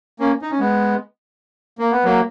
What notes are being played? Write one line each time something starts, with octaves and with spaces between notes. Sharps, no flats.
A#3 C#4
D#4
C#4
G#3 B3
A#3
B3
F#3 A#3